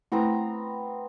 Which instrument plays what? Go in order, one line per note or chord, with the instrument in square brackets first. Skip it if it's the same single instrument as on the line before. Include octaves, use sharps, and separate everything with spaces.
[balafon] A3 E4 [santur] B3 C4 A#5